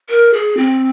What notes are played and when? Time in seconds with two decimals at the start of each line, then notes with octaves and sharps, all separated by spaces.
0.09 A#4
0.33 G#4
0.57 C4